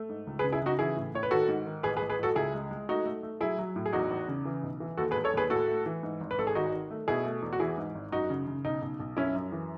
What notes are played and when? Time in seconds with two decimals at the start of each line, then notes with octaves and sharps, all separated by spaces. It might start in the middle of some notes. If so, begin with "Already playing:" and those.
Already playing: A3
0.09 G#2
0.27 C#2
0.39 G#4 B4
0.44 C#3
0.52 E4 G#4
0.62 C#3 D#4 F#4
0.79 E3 E4 G#4
0.96 A2
1.14 A2 C#5
1.23 B4
1.31 D#3 F#4 A4
1.48 G#2
1.66 D#3
1.83 A1 G#4 B4
1.97 G#4 B4
2.01 A1
2.09 G#4 B4
2.19 A1 F#4 A4
2.35 C#2 E4 G#4
2.54 G#3
2.71 G#3
2.89 A3 D#4 F#4
3.06 A3
3.23 A3
3.41 F#3 E4 G#4
3.59 F#3
3.76 A2
3.86 G#4
3.93 E2 D#4 F#4
4.11 E2
4.28 C#3
4.45 E3
4.63 B1
4.80 E3
4.97 D#2 F#4 A4
5.11 G#4 B4
5.15 E1
5.24 A4 C#5
5.33 D#2 G#4 B4
5.50 A2 F#4 A4
5.68 A3
5.86 E3
6.03 G#2
6.21 G#1
6.31 B4
6.38 G#1 A4
6.47 G#4
6.55 D#3 D#4 F#4
6.72 D#3
6.91 A3
7.08 B2 E4 G#4
7.25 A3
7.42 E2
7.53 F#4
7.59 E3 E4 G#4
7.78 G#2
7.95 G#1
8.12 F#2 D#4 F#4
8.30 C#3
8.47 C#3
8.65 B1 D#4
8.82 B1
9.00 B1
9.17 F#2 C#4 E4
9.34 F#2
9.52 E3